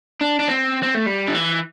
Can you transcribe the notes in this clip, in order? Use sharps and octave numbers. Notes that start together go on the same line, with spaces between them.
D4
D4
C4
C4
A3
G3
D3
E3